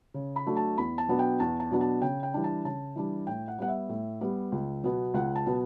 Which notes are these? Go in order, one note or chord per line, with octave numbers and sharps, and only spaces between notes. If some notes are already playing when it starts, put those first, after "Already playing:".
C#3
B5
F#3 A3 D4
A5
E2 B5
A5
B2 F#3 B3 D4
G5
E2 A5
A5
B2 F#3 B3 D4
A5
C#3 G5
G5
E3 G3 D4
A5
C#3 A5
E3 G3 D4
A2 G5
F#5
G3 B3 F#5
E5
A2
G3 B3
C#2
B2 F#3 B3
C#2 F#5
A5
B2 F#3 B3